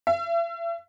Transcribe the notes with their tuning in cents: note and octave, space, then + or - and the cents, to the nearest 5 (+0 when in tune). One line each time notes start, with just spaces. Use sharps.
E5 +35